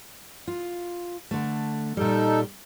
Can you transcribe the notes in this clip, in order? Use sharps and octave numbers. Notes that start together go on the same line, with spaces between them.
F4
D3 A3
A#2 G3 D#4 A4